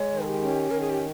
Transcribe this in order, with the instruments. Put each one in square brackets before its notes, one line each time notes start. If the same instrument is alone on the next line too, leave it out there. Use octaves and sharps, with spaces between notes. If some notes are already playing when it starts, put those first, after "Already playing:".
Already playing: [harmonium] G#3 [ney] C#5
[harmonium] D#3
[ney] G4
[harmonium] C#4
[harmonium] D#3 [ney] A#4
[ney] G#4
G4